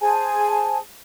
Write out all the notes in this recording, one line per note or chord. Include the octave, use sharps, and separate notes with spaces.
G#4 C5 G#5 A5